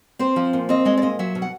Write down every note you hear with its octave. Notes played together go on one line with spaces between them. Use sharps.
C4 C5
F3
A#2
C4 D#5
G#3 D#5
D5
A#2 D#5
F#3 E5
B2
F#5